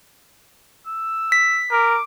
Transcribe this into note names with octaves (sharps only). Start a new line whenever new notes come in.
E6
B6
A#4 D6